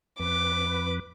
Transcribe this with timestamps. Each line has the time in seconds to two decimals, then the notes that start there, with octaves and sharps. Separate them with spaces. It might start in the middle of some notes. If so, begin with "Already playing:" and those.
0.20 F2 B4 D6